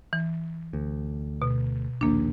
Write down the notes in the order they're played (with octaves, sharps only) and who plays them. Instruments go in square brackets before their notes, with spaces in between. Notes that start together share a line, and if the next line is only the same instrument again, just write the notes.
[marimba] E3
[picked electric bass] D2
[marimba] B2
[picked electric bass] A#1 D#2 [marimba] A#3 D4